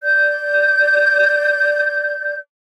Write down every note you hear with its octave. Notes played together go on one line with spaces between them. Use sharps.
D5 G6